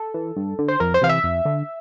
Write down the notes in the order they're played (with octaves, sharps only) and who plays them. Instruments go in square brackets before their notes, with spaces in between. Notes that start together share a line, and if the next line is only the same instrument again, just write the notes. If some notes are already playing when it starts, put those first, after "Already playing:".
Already playing: [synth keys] A4
E3
G2
D3
C5
F2 A#4
C5
C3 E3 F5
E5
F2
D3